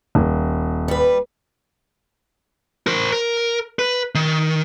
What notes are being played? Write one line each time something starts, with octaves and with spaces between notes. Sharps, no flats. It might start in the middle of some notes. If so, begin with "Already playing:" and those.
D#1
G3 B4
A#4 C5
A#4
B4
D#3